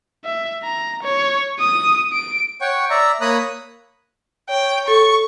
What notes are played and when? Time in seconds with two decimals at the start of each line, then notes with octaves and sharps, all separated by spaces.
0.25 E5
0.64 A#5
1.03 C#5
1.60 D#6
2.13 D7
2.60 C#5 F#5 G5 C#6
2.90 D5 E5 A#5
3.21 A#3 C#5 A#5 B5 D#6 F#6
4.50 C#5 G5
4.88 A4 C#6